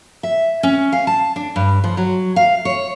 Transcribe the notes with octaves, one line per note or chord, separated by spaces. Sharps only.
E5
C#4
F5
A5
D4
G2
F3
F#3
F5
C#5